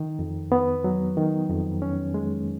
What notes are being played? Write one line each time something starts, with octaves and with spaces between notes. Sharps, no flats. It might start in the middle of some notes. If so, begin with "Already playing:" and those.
Already playing: D#3
F2
B3
F#3
D#3
F2
C#4
G#3